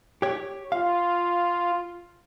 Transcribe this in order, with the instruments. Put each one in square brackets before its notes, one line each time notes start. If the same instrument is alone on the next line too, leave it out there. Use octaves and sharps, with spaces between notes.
[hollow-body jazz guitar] G4 C#5
[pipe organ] F4 [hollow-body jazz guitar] F5